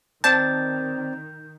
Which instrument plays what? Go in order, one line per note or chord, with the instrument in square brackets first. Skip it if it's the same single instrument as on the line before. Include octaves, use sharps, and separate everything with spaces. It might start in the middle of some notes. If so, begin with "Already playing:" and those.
[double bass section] D#3 [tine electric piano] C4 D5 A6 [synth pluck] A5 [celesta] G6